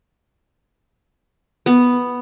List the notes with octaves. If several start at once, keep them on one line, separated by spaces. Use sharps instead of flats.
B3